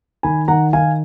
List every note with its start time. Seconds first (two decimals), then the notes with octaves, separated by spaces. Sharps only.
0.23 D#3 G#5 B5
0.48 D#3 F#5 A#5
0.73 D#3 F5 G#5